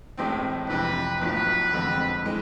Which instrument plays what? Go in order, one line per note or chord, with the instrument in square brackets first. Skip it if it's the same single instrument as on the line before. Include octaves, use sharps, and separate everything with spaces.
[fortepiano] A1 A2 G#3 C4
[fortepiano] F2 C3 E3 [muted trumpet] B4
[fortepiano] B1 A2 F3 [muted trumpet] B4
[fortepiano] F2 D3 G#3 C4
E3 G#3